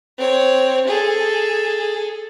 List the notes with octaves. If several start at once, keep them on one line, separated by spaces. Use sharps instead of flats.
C4 C#5
G#4 A4